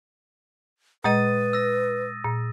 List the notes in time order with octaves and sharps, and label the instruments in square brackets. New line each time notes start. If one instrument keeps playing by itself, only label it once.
[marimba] A#2 G#3 D#5 [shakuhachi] B4 [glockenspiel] D#6 A6 D#7
[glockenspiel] E6 A#6
[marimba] A#2